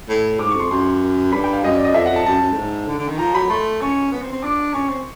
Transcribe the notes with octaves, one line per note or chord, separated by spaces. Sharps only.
A2
G#2 D6
C#6
F2 C6
F#2 C6
G2 B5
G5
F5
F#2 D#5
D5
D#5
F2 E5
F#5
F2
A5
F#2 A5
F#2
A2
G#2
D3
D3
D#3
F3 A#5
F#3 B5
A3 C6
C#4 C#6
B3
C4
C4
D4 D6
C#4 C#6
C4